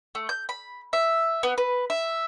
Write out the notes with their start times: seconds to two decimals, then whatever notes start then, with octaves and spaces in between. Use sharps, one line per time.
0.15 A3
0.29 G6
0.49 B5
0.93 E5
1.43 B3
1.58 B4
1.90 E5